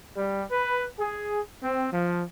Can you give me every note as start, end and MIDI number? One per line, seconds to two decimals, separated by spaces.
0.16 0.43 55
0.50 0.86 71
0.98 1.39 68
1.62 1.87 60
1.92 2.23 53